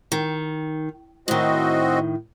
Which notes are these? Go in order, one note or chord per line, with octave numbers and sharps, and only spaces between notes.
D#3
A2 D#3 C4 F#4 D#5